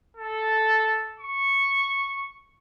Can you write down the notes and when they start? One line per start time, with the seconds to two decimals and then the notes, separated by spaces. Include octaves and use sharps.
0.17 A4
1.20 C#6